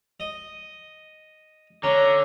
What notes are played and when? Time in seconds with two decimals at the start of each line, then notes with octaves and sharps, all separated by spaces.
0.20 D#5
1.83 D3 C#4 A#5